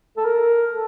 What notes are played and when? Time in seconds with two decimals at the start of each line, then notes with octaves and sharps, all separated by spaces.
0.17 A4
0.25 A#4
0.70 A4